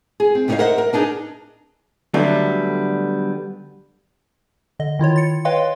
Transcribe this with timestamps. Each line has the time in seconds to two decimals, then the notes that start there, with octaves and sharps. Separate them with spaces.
0.20 G#4
0.35 C4
0.48 C3 B3 D#4 E4 C#5 F5
0.59 A#4 C5 D#5 E5 F#5
0.78 A#4
0.93 B3 D4 D#4 G#4
2.14 D3 F#3 G3 A3 B3
4.80 D3 D#5
4.99 D#3 E4 F4 C#5
5.16 A6 C#7
5.45 B4 C#5 D#5 F5 G5 C6